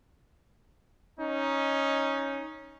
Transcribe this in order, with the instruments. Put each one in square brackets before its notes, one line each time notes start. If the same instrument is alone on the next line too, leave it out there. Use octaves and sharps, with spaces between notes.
[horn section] C#4 D#4